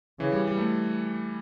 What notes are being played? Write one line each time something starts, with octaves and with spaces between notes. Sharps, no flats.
C#3 E3
G3
G3
A3